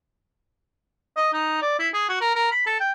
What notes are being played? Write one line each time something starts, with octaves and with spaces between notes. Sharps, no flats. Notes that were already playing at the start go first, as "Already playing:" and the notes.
D#5
D#4
D5
E4
G#4
F#4
A#4
A#4
B5
A4
G5